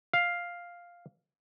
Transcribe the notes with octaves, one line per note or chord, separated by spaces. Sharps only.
F5